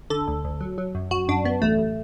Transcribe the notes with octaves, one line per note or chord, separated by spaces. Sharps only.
D3 A4
D2
D2
F#3
F#3
F#2
F#2 F#4
F#2 D4
F#2 B3
A1 A3
A1